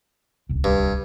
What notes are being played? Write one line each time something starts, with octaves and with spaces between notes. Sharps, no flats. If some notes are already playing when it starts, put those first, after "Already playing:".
D1 C2
G2